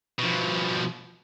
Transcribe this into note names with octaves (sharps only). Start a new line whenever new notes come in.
B2 F3